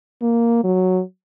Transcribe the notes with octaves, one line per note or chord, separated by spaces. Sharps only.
A#3
F#3